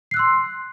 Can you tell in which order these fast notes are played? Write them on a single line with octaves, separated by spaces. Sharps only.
C7 F#6 E6 C6